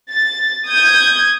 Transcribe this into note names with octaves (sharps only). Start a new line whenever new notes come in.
A6
D#6 G6 G#6